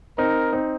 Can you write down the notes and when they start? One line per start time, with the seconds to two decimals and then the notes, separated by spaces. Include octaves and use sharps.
0.18 C4 D#4 A#4
0.53 C4 D#4